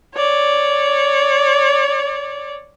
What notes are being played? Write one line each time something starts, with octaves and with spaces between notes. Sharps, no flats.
C#5 D5